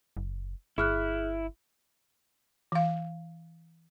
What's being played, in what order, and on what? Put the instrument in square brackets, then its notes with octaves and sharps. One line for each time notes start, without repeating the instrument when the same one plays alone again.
[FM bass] F#1
[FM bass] G1 [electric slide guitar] E4 [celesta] G#4 F6 F#6
[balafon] E3 F5